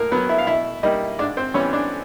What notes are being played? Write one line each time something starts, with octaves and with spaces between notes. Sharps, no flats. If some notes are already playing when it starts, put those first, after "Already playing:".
Already playing: A2 A#3 A#4
F#3 B3 B4
E4 E5
F5
B2 E4 E5
G3 A#3 D#4 D#5
G#2 D4 D5
C4 C5
E3 G3 B3 C#4 C#5
D4 D5